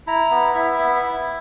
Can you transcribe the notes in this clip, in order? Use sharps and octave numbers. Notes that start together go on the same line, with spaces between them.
E4 A#5
B3
E4 E5
B3
E4